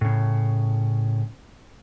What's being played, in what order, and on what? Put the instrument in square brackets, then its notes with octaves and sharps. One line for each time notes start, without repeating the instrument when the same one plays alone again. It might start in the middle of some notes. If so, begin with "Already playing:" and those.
[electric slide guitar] A2 C#3